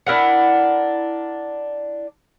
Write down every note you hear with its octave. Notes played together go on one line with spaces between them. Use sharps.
D4 E4 A#4 F#5